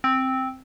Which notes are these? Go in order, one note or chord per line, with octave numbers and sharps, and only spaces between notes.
C4